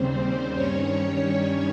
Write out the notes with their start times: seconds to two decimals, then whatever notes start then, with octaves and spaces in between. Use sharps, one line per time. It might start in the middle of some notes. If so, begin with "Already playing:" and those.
Already playing: D#2 C#3 G3 C4 C5
0.54 G2 D#3 G3 C#4 C#5